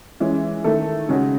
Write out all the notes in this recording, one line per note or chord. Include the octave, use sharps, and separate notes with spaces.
E3 G#3 C#4
D#3 A3 E4 A4
C#3 G#3 C#4 F#4